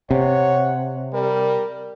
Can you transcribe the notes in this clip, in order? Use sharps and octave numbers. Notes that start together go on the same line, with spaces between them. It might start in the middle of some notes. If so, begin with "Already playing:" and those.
C3 C#5 F#5
G3 A#4